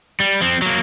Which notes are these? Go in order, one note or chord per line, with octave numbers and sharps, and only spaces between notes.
G3
F3 C4
F#3 A#3